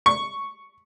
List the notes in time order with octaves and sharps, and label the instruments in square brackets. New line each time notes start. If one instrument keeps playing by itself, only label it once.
[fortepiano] C#6